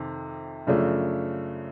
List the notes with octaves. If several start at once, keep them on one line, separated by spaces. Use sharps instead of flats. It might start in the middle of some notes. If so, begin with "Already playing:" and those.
Already playing: F2 C3 D#3
F#2 C#3 F3 A3 D4